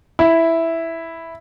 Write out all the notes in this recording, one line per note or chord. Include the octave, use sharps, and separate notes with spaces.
E4